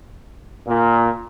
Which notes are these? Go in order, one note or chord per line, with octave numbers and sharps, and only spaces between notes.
A#2